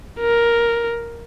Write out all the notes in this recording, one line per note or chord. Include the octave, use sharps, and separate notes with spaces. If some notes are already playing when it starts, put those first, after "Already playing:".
A#4